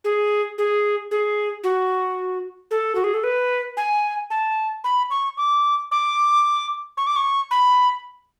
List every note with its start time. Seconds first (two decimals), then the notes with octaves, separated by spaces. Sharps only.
0.04 G#4
0.58 G#4
1.11 G#4
1.64 F#4
2.71 A4
2.95 F#4
3.04 G#4
3.14 A4
3.24 B4
3.77 G#5
4.30 A5
4.84 B5
5.10 C#6
5.37 D6
5.91 D6
6.97 C#6
7.07 D6
7.16 C#6
7.51 B5